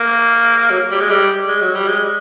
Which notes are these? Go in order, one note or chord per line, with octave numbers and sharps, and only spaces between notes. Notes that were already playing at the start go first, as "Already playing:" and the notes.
Already playing: A#3
F#3
G3
G#3
G3
G#3
F#3
G3
G#3